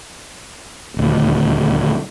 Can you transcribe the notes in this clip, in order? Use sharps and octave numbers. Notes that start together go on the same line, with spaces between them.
D#1 D2